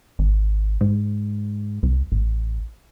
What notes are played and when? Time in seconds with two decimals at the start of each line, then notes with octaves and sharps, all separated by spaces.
0.19 G#1
0.81 G#2
1.83 C2
2.12 A1